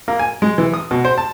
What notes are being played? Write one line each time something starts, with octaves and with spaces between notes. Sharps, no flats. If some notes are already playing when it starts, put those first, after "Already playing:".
A#3
G#5
G#3
E3
D#6
B2
C5
A5